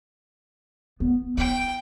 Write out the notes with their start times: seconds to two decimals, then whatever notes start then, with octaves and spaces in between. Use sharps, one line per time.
1.00 B3
1.38 E4 G5